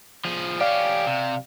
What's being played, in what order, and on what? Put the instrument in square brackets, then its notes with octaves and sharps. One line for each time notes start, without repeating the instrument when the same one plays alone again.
[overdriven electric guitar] F3 G#4
[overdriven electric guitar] C#4 G4 [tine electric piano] D5 F5
[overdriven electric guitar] C3